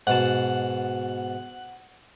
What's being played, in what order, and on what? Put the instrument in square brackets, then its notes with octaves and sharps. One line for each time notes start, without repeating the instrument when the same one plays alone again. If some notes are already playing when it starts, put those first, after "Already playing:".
[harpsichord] G#2 B2 A5 [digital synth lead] F#5